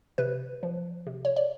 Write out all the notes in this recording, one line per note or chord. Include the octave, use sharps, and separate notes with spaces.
C3 B4
F3
C3
C#5
D5